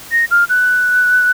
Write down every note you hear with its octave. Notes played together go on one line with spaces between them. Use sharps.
A#6
F6
F#6